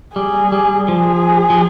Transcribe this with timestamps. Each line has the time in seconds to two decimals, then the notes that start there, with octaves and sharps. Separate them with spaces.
0.16 G3 G#4
0.52 G3
0.88 F3 G#4
1.50 F3